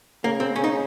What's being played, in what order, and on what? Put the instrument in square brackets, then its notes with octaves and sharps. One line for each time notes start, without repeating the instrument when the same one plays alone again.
[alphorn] C#3 [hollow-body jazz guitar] A#3
[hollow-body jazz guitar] C4
[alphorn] C#3 [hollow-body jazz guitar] C#4
[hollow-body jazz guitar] D#4